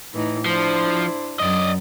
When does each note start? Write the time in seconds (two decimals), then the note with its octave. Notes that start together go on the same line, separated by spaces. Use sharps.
0.13 A2 E3 D#4
0.46 F3 D4 E4 C5
1.40 F#2 D5 D#5